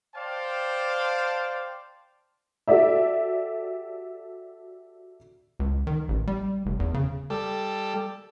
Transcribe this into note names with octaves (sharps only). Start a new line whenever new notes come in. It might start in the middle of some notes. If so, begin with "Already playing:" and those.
C5 D5 F5 G5 A5
F#4 G4 A4 D5 E5
C#2
D#3
A1
G3
F1
E2
C#3
G3 A4